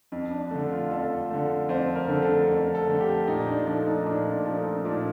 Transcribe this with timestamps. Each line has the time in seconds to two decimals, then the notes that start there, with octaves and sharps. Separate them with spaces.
0.12 F2
0.31 D4
0.51 D3 A3
0.71 F4
0.91 F2 A4
1.31 D3 A3
1.69 F2 C5
1.95 A#4
2.08 D3 A3
2.22 A4
2.48 F2
2.75 A4
2.88 D3 A3
3.00 G4
3.27 A#2 D#4
3.47 D4
3.67 F3 A3 D4
3.86 D#4
4.06 A#2 D4
4.32 D4
4.45 F3 A3
4.59 D#4
4.77 D#4
4.85 A#2 D4